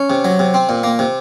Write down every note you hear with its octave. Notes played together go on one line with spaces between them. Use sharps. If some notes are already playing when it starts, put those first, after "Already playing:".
Already playing: C#4
C3
F#3
C3
C4
A#2
A#3
C3